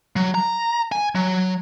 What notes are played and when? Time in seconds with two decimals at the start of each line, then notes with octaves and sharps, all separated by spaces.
0.16 F#3
0.35 A#5
0.92 G#5
1.15 F#3